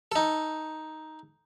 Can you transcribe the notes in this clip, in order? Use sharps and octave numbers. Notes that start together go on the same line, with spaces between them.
D#4 A4